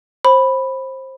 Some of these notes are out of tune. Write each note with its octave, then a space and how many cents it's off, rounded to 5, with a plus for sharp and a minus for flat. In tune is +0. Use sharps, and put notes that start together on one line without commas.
C5 +20 B5 +0